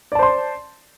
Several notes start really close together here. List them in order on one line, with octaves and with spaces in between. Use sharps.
D5 A5 C5 C6